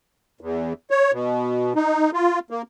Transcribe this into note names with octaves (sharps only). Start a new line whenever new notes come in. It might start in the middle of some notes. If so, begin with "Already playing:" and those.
E2
C#5
B2
D#4
F4
A#3